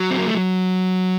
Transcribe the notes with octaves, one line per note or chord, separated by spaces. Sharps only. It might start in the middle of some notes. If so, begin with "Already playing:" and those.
Already playing: F#3
C4
A#3
A3
F#3